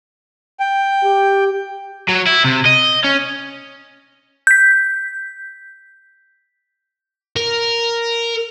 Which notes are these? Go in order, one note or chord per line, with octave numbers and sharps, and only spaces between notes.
G5
G4
F#3
E4
C3
D#5
C#4
G6 B6
A#4